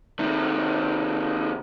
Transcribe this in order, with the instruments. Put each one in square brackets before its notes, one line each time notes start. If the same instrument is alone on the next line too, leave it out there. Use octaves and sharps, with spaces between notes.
[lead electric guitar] C3 D#3